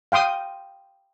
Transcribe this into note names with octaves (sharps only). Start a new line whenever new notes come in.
F5 G5 C6 D#6